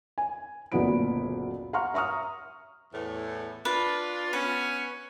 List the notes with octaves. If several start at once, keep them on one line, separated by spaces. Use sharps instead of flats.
G#5
F#1 D2 A#2 B3 B5 D7
F5 F#5 A#5 C6 C#6 F6
E5 A#5 C#6 D#6 F6
E2 A2
D4 F4 B4
B3 C#4 B4